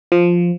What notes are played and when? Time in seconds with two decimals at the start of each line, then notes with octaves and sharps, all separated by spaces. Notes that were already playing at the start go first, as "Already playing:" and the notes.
0.12 F3